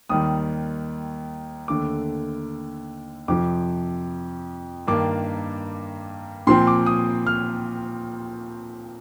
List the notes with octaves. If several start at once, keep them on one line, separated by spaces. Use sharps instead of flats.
D#2 D#3 G3 D#6
D#2 D3 A3 D6
F2 C3 F3 D6
G2 D#3 A#3 D4 D6
A#2 F3 C4 C6
D6
D#6
F6